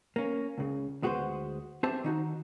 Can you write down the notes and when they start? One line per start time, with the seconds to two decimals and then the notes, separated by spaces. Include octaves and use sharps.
0.16 A#3 C#4
0.58 C#2 C#3
1.02 D2 G#3 F#4 G4 B4 C5
1.83 C4 G4 C5 E5 A5
2.04 D#3 D#4 F#4